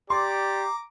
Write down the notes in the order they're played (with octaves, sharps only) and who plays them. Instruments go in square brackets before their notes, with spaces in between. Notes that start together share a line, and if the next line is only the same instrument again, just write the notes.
[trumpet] G4 [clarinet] D5 [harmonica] A#5 D6 [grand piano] C6